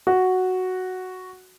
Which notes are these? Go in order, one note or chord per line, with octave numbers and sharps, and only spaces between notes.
F#4